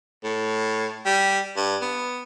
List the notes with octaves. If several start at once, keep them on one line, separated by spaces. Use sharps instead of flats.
A2
G3
G2
B3